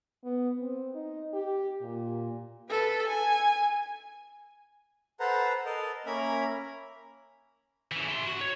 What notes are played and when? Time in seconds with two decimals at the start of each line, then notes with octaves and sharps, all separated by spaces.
0.24 B3
0.59 C4
0.95 D#4
1.33 G4
1.82 A#2
2.70 A4 B4
3.07 G#5
5.20 A4 B4 C5 F#5 A#5
5.66 A4 A#4 D#5
6.06 A#3 C#4 A#4 E5 A#5 B5
7.92 C#3 E3
8.08 E4 C6
8.27 F#4
8.41 C#5